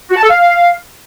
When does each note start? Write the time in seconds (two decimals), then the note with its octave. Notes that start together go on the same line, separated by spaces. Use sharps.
0.11 F#4
0.17 A5
0.24 A4
0.30 F5